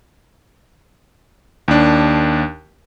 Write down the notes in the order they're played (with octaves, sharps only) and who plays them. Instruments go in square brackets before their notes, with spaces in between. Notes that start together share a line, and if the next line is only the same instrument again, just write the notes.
[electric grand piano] D#2 D4